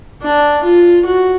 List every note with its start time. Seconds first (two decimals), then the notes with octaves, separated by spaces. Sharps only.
0.22 D4
0.63 F4
1.06 F#4